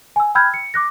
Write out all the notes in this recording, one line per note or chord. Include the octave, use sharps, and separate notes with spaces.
G#5 E6
G5 B5 E6 F6 G6 G#6
C#7
D6 F#6 A#6